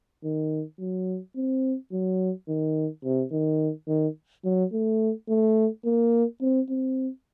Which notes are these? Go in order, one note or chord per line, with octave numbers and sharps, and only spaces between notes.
D#3
F#3
C4
F#3
D#3
C3
D#3
D#3
F#3
A3
A3
A#3
C4
C4